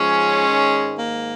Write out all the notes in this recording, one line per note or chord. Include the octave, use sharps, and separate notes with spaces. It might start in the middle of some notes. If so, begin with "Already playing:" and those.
Already playing: G#2 F3 G#3 C#4
G#2 D#3
A#3